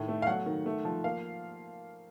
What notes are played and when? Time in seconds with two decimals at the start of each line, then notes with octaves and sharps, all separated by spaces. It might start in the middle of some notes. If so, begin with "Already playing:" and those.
Already playing: A2 D#3
0.08 A3
0.22 F5
0.27 F#3 F#5
0.46 D#3
0.66 A3
0.85 F3
1.04 A#3 F5